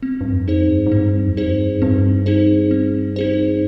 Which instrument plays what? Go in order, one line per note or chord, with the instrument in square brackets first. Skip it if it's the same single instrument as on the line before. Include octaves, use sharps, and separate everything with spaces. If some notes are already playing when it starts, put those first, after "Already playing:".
[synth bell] C4
[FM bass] G2
F2
[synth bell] D#4 G#4 C5
[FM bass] G2
G#2
[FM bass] G2 [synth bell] C4
[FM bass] F2
[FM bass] G2 [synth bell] D#4 G#4 C5
[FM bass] G2 [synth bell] C4
[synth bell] D#4 G#4 C5
C4
D#4 G#4 C5